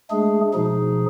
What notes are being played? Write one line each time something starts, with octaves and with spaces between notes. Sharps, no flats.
G#3 A3 D4 G#4
B2 F3 D#4 G#4